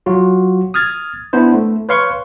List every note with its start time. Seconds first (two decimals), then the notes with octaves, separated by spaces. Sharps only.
0.06 F#3 F4 F#4
0.74 D#6 F6 G#6 A6
1.33 B3 D4 E4 C5
1.54 A3
1.89 B4 C#5 F5 C6 C#6